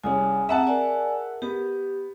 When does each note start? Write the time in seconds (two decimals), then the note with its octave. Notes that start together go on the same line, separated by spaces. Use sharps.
0.04 C2 C#4 G#4 G#5 D#6 F6
0.49 C4 E5 F#5 A5 A#5
0.67 G#4 A#4 D5 G#5
1.42 B3 G4